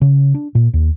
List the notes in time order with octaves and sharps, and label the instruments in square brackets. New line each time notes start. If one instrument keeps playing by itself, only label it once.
[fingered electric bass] C#3
D4
A#2
D#2